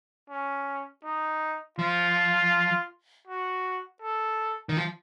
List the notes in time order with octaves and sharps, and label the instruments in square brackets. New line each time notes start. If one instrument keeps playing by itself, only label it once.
[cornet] C#4
D#4
[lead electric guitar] F3 [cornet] F4
[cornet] F#4
A4
[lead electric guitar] D#3
F3